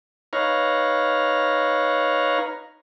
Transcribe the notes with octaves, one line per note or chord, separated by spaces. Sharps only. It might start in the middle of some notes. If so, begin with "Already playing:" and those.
D#4 B4 C#5 F5 A#5